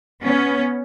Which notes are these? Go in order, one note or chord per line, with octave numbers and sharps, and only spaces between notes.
B3 C#4